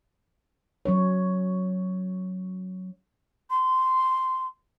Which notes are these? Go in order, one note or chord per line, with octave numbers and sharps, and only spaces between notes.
F#3 C#4 C#5
C6